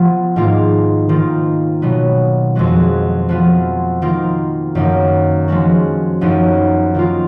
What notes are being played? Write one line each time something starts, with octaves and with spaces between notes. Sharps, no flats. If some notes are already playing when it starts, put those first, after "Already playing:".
Already playing: F3 B3 F4
G#2 D#3 A#3 F4
D#3 A#3 F4
B2 F#3 B3
F2 F3 G#3 B3 F#4
F3 B3 F4
D#3 A#3 F4
F#2 D#3 A#3
F3 G#3 C#4 F#4
F#2 F3 B3 D#4
D#3 A#3 F4